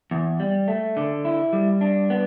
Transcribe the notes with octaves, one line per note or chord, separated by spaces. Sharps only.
E2
G3
A3
D3
E4
G3
D4
B3